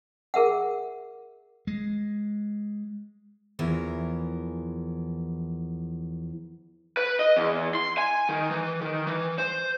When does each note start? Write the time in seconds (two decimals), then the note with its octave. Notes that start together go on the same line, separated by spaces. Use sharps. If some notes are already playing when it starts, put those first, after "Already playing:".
0.34 G#4 A#4 E5 F#5
1.67 G#3
3.59 E2 E3 F3 A#4
6.97 B4
7.19 D#5
7.37 E2
7.75 C6
7.98 G#5
8.29 D#3
8.51 E3
8.81 D#3
9.07 E3
9.38 C5